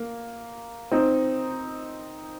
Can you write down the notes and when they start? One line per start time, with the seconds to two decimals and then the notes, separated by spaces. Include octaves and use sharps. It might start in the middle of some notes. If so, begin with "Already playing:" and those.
Already playing: A#3
0.91 C4 D#4